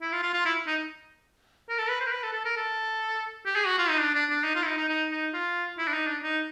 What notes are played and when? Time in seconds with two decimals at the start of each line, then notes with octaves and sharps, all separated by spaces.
0.01 E4
0.12 F4
0.23 F4
0.33 F4
0.45 E4
0.67 D#4
1.69 A#4
1.78 A4
1.89 B4
2.01 C5
2.07 A#4
2.12 B4
2.23 A4
2.33 A4
2.45 A#4
2.57 A4
3.46 G4
3.56 G#4
3.66 F#4
3.79 F4
3.89 D#4
4.00 D4
4.14 D4
4.30 D4
4.44 D#4
4.55 F4
4.63 E4
4.67 D#4
4.77 D#4
4.89 D#4
5.11 D#4
5.34 F4
5.78 E4
5.87 D4
5.93 D#4
6.07 D4
6.23 D#4